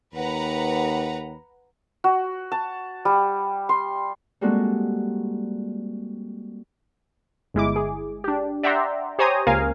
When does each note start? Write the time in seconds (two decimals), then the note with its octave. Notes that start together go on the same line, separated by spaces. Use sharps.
0.14 D#2 B4 F#5 A#5
2.04 F#4
2.52 A5
3.05 G3
3.69 C6
4.41 G3 G#3 A#3 C4 F#4 A4
7.54 G1 G#3 E4 D6
7.76 G#4
8.24 D4 G4
8.63 D5 E5 F#5 G5 A#5 C6
9.19 G4 C5 C#5 G#5 A#5 D#6
9.47 C#2 A#3 A#4 F5 G#5